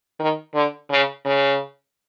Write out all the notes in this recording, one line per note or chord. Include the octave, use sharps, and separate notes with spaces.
D#3
D3
C#3
C#3